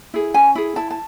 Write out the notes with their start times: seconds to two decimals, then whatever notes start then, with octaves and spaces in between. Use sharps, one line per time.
0.14 E4 G#4
0.34 C#4 G#5
0.55 E4 G#4
0.76 E4 A5
0.91 A5